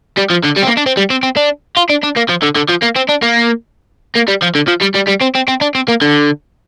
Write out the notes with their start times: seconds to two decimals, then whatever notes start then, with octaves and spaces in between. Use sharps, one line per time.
0.17 G3
0.30 F3
0.43 D3
0.56 G3
0.62 C4
0.67 A#3
0.77 D4
0.86 C4
0.97 G3
1.10 C4
1.23 C4
1.37 D4
1.77 F4
1.90 D4
2.03 D4
2.17 A#3
2.29 F3
2.43 D3
2.56 D3
2.69 F3
2.83 A#3
2.96 C4
3.09 D4
3.23 A#3
4.16 A#3
4.28 G3
4.42 F3
4.55 D3
4.68 F3
4.82 G3
4.95 G3
5.08 G3
5.21 C4
5.35 C4
5.48 C4
5.61 D4
5.75 C4
5.88 A#3
6.02 D3